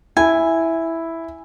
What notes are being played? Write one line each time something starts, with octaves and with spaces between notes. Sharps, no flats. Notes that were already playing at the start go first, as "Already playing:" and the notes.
E4 G#5